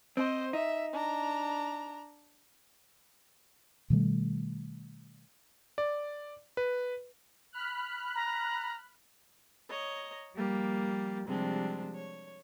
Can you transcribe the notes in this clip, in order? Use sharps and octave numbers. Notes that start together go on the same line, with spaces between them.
C4 C5 D#5
D#4 E5
D4 A#5
B2 D#3 G3 A3
D5
B4
B5 F6 F#6
A#5
C#5 D#5 A#5
F3 G3 A#3 G4
C3 F3 G3 G#3 C4 D4
C#5